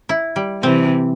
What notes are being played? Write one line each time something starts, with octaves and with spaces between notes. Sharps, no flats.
E4
G3
C3 E3 C4